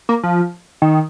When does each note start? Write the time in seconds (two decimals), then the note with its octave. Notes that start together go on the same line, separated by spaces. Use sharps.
0.09 A#3
0.23 F3
0.82 D#3